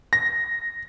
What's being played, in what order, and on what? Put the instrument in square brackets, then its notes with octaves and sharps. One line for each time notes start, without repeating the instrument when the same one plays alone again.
[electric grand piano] A#6